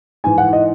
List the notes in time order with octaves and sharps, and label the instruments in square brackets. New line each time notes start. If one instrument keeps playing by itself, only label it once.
[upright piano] G#2 E3 G#5
F#5
D#5